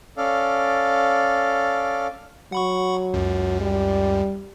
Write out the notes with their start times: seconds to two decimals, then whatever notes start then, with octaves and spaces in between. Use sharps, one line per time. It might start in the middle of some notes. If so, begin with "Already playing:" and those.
0.17 C#4 A4 D5 F5
2.52 F#3 F#5 B5 C#6
3.14 C#2 F#2
3.61 G3